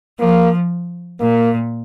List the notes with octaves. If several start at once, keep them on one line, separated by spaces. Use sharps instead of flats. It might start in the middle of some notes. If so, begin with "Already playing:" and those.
F3 A#3
A#2 A#3